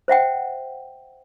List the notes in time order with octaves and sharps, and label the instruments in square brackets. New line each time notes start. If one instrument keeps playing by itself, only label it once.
[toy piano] C5 E5 F#5 G5